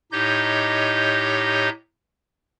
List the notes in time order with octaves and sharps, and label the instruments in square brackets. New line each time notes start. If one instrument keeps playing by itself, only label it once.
[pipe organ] A2 D#4 G4 C#5 D#5 G6